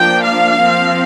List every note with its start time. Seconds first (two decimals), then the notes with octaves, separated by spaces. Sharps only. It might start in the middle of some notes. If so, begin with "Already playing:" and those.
Already playing: F3 A#3 D4 G5
0.23 F5
0.61 F3 C4